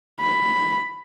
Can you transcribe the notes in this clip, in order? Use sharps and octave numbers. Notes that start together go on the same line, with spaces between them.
B5